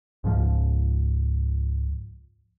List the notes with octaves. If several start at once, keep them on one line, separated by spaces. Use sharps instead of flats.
C#2 G#2 F3